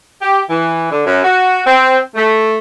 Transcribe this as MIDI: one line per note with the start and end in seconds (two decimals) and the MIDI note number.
0.21 0.40 67
0.50 0.89 52
0.91 1.03 50
1.06 1.20 42
1.24 1.60 66
1.66 1.97 60
2.15 2.58 57